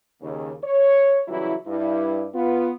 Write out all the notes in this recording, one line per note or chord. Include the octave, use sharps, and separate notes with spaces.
D#2 C#3
C#5
C#3 E3 F#3 G3 E4
G2 E4
B3 F4